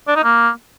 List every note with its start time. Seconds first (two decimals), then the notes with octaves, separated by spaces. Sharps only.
0.07 D4
0.16 D#4
0.24 A#3